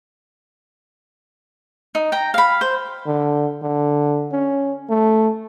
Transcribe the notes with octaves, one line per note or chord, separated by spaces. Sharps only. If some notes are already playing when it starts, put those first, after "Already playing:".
D#4
G5 A#5
F5 B5
C5
D3
D3
C#4
A3